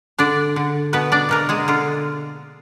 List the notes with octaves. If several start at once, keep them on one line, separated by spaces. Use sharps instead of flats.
D3 D4 D5
D3
B2 B3 B4
D4 D5
B2 A#3 A#4
G#3 G#4
D3 F4